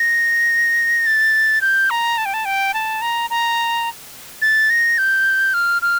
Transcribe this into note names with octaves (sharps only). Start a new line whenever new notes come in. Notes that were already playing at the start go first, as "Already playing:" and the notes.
Already playing: A#6
A6
G6
A#5
A5
G5
A5
G5
A5
A#5
A#5
A6
A#6
G6
F6
F6